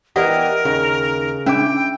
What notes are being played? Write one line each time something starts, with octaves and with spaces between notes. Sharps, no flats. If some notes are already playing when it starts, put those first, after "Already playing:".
E3 B3 G4 A#4 D5 D#5 F#5
D#2 C#3
C#4 D4 E4 G5 D6